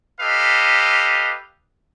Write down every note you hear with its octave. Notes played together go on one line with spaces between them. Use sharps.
G4 A4 B4 D#5 F5